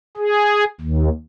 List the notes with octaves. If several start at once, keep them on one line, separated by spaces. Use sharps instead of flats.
G#4
D#2